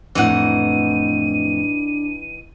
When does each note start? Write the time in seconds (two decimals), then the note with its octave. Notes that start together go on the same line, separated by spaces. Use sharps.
0.15 F2 A2 E3 D4 D#4 F#5 D#7